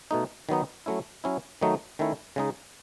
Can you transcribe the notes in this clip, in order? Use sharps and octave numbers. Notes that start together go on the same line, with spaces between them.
B2 A3 D#4
D#3 F#3 B3 D#4
F#3 A3 C#4 E4
F#3 C#4 E4
D#3 F#3 A3 D#4
D#3 A3 C#4 E4
C#3 G#3 D#4